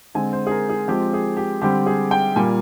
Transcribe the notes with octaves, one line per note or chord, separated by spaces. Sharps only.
D3 G#3 C4 G#5
C5
G#4
A#4
G#4
F3 G#3 C4 G4
G#4
G4
D3 G3 C4 G4
G#4
G5
A#2 G3 A#3 G#5